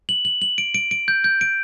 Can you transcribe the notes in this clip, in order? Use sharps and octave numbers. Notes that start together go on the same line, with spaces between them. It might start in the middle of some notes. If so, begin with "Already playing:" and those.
F#7
F#7
F#7
D7
D7
D7
G6
G6
D7